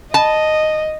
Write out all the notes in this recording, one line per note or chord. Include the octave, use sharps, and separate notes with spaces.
D#5 A5